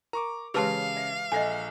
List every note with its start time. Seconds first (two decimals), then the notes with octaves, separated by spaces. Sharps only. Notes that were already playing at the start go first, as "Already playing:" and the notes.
0.13 A#4 A#5 C#6 D6
0.54 C#3 E3 G#3 G4 G#4 B4 F5 A5
0.97 E5
1.32 A#1 A4 D#5 E5 G#5